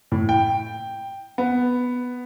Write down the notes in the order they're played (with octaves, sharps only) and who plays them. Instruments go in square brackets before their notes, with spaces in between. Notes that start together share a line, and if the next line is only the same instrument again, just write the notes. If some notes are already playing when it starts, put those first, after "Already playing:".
[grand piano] A2
G5
B3